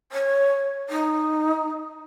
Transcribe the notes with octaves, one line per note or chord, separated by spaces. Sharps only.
C#5
D#4